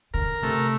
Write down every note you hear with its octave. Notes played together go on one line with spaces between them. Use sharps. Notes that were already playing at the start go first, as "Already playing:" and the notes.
D3 A#4
C3 A3